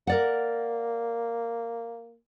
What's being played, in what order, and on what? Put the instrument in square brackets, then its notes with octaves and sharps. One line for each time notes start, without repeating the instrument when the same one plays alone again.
[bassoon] A#3 [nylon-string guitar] A#4 D5 F#5